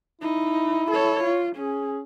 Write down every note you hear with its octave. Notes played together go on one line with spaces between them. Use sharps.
D#4 E4
A4 C#5
F4
C#4 G#4